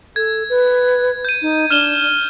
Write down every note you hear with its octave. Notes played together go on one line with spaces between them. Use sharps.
A4 G#6
B4
G6 D#7
D#4
D4 F6 E7 G7